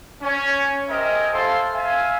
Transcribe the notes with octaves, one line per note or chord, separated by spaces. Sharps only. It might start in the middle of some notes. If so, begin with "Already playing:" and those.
C#4
G4 A#4 C5 D#5 E5 G#5
E4 A4 C5 F5 C6
E5 F5 G#5